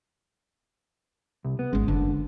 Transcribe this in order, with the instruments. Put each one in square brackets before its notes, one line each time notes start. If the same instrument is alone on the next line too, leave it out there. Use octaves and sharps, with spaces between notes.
[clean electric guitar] C2
B3
[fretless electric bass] G#1 C#4 [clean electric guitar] G#3
[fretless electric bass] F#1 [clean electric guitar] D3